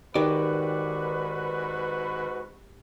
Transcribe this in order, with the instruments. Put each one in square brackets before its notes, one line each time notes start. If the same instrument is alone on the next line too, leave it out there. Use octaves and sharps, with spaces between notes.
[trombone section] G#2 F#4 B4 [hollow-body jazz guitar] D#3 [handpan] G4 [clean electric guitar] D5